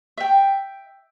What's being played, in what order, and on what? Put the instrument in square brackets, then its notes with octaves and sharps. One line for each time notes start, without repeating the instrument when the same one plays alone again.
[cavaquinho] E5 G5